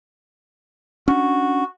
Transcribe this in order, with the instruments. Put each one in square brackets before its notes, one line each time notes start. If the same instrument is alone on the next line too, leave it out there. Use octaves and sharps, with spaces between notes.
[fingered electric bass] C#4 D4 [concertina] F#4